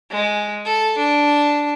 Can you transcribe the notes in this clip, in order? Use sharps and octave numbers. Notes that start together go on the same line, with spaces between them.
G#3
A4
D4